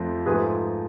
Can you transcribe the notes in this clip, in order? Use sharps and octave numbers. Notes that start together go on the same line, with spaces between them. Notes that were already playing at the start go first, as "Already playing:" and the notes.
Already playing: F2 F3 A3
G#2 F3 A3 G#4 B4